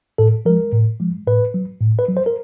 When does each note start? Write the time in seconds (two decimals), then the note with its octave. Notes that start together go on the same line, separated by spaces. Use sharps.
0.18 A2 A4
0.45 F3 G#3 A#4
0.73 A2
1.00 F3 G#3
1.27 A2 B4
1.54 F#3
1.80 A2
1.99 B4
2.09 F#3
2.17 C5
2.26 A#4